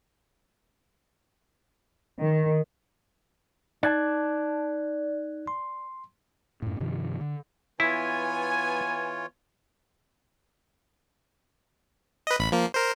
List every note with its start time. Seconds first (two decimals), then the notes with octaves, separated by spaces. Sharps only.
2.20 D#3
3.83 D#4 D5 A5 F#6 G#6
5.47 C6
6.62 F#2 A2
6.80 G2 C3 D#3 F3
7.21 D3
7.80 E3 B3 E4 F4 C#5 G#5
12.27 B4 D#5
12.39 A1 B5
12.52 F3 A#3
12.74 A#4 C5